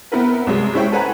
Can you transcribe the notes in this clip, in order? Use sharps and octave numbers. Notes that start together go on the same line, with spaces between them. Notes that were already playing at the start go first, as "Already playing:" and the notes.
B3 C4 E4 A#4 B4
C2 F#3 G#3
G#3 C#4 E4 C5 C#5 G5
A4 B4 C5 F#5 G#5 A#5